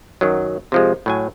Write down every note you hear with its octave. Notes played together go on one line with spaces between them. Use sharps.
F#2 D#3 F#3
C3 F3 G#3
A2 F#3 G#5